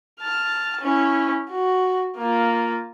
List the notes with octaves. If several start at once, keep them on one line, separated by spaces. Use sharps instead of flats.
A5 F6
C#4 E4
F#4
A#3 F4